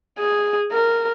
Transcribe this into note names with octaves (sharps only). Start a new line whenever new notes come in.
G#4
A#4